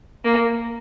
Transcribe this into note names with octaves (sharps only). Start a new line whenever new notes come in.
A#3